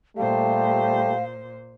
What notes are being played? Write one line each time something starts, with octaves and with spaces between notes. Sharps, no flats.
A#2 G3 A3 G4 C5 F5